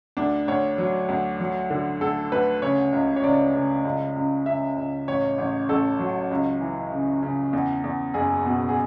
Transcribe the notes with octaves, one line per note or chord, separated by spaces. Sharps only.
D2 D4
D2 C#5
F#3
D2
F#3
D3
D2 A4
D2 B4
C#3 C#5
C#2
C#5
C#2 D5
C#3
C#2
C#2
C#3 E5
C#2
A1 C#5
A1
A1 A4
F#3
C#2
E3
C#3
C#3
E2
E2
F#1 G#4
B2
G#4